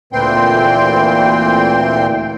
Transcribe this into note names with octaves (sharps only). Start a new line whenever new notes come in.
D2 A#2 E3 C4 G5 C6